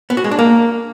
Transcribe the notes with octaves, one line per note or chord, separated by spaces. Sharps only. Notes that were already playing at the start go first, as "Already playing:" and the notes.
B3
F#4
G#3
D4
A#3